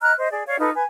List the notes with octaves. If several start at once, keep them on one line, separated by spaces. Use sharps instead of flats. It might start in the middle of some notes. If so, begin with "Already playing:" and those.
D#5 A#5 F6 F#6
C5 D#5
G#4 D5
C#5 D5 F5
D#4 F4 A4 B4
B4 G#5